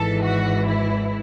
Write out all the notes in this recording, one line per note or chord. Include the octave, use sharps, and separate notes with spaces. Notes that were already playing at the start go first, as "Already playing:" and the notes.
Already playing: G#1 G#2 E3 A4
F#4
E4